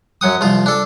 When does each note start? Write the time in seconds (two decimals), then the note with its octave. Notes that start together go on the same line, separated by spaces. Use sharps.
0.21 F#2 F#3 F#5 D#6
0.41 C2 F3 F4
0.66 D4 A4